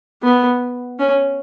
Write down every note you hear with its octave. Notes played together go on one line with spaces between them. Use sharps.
B3
C#4